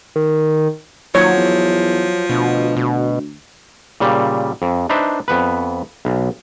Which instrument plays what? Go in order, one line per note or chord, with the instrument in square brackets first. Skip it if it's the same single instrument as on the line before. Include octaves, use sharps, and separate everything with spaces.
[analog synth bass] D#3
[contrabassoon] D#2 [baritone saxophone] F3 [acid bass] F#3 [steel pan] C#5
[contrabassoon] E2
[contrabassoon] D2 [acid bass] B2
[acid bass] B2
[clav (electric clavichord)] A#2 C#3 G3
F2
D4 D#4 B4 C5 E5
F2 B3 B4
B1